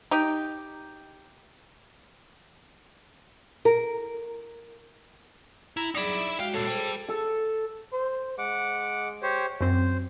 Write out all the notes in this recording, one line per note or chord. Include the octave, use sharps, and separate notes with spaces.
D#4 G4
A#4
E4 A#5
F#3 G3 D#4 E4 G#4 D5
E5
G#3 F#4 G4 F5 G5
G3 A4 C#5
G3 G#4 C5 D6
A4
C5
G#3 F#5 D6
G4 C5 C#5
F#2 C4 C5